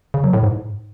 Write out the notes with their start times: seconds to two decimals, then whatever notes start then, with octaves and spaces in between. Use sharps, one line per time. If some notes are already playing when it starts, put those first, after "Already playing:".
0.14 C#3
0.24 F#3
0.33 A2
0.43 G#2